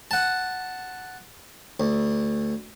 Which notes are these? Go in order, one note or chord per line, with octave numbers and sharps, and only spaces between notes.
F#5 A5
D2